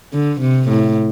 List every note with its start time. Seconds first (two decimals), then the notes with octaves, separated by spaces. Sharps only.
0.13 D3
0.41 C3
0.69 A2